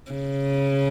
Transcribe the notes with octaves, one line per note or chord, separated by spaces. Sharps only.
C#3